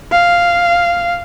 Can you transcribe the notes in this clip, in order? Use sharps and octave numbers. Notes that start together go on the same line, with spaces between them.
F5